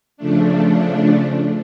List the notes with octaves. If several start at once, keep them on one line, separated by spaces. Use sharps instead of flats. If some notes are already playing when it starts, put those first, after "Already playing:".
C#3 F3 A3 D4